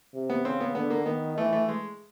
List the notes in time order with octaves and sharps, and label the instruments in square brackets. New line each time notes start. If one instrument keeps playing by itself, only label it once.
[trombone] C3
[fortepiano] B3
[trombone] C#3 [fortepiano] C4
[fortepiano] B3
[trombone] D3 [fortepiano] B3
[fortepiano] A#3
[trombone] D#3 [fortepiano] B3
[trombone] E3 [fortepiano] A3
[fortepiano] A3
G#3